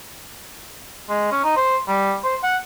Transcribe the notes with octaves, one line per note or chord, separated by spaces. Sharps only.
G#3
C#4
D#4
C5
G3
C5
F#5